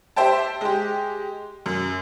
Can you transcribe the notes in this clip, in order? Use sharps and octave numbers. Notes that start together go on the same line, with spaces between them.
G4 C5 E5 G5 A5
G#3 G4
F#2